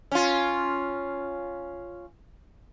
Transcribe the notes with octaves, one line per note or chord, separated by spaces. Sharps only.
C#4 F4